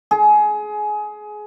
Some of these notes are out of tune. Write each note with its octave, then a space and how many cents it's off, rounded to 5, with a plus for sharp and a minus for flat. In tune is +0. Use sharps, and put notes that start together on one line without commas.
G#4 +20